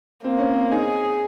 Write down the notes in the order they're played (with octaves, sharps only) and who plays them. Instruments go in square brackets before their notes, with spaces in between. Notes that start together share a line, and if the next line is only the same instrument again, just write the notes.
[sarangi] A#3 [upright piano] C4
[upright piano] C#4
C4
[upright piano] D#4 [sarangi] G#4